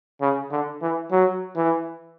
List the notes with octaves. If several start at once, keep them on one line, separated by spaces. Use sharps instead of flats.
C#3
D3
E3
F#3
E3